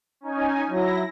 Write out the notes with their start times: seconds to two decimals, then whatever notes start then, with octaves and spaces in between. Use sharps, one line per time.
0.21 C#4 D#4 G#5
0.70 F#3 E4 A#6